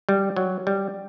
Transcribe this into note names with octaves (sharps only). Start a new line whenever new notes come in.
G3
F#3
G3